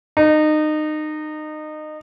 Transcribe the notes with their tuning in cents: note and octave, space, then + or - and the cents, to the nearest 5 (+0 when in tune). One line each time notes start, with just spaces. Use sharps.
D#4 -25